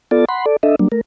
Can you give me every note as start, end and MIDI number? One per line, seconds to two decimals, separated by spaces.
0.11 0.25 59
0.11 0.25 65
0.11 0.25 69
0.11 0.25 74
0.11 0.25 81
0.29 0.46 78
0.29 0.46 83
0.29 0.46 84
0.46 0.56 69
0.46 0.56 74
0.63 0.76 62
0.63 0.76 69
0.63 0.76 75
0.63 0.76 76
0.79 0.88 54
0.79 0.88 55
0.79 0.88 58
0.79 0.88 62
0.92 1.01 57
0.92 1.01 70